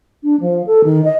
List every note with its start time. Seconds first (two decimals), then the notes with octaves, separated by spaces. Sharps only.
0.24 D4
0.40 F3
0.66 A4
0.84 D#3
1.04 D#5